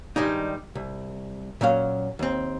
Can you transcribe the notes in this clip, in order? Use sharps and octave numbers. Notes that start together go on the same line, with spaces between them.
G2 D#3 G3 G#3 D#4
C2
A#2 F#3 C#4 F5
D#2 C4